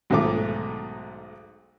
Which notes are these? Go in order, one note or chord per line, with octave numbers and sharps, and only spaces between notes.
B1 G#2 D#3 A3 F4 D6